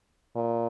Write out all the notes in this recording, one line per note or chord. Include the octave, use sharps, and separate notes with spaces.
A#2